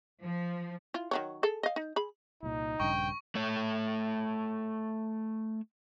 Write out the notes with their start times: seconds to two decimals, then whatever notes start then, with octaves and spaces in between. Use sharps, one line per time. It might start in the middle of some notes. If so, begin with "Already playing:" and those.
0.23 F3
0.94 E4 F4
1.11 D#3 F#3 C#5
1.43 G#4 A4
1.63 D#5 F5
1.76 D#4
1.96 G#4 B5
2.43 C2 A#2 D#4
2.80 A#1 G2 C#3 G5 C#6
3.35 A3 C#5